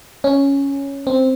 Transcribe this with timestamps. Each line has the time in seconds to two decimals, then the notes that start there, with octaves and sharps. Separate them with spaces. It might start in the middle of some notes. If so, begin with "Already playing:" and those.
0.24 C#4
1.07 C4